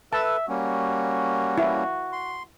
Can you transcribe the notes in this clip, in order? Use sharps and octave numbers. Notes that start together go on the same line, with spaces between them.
A4 B4 E5 A5
G3 A#3 C#4 F#4
E4
C6